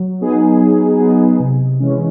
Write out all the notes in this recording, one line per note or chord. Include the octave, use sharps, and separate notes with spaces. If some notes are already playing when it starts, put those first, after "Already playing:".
Already playing: F#3
B3 D#4 G#4
F#3
B3 D#4 G#4
C3
E3 G#3 C#4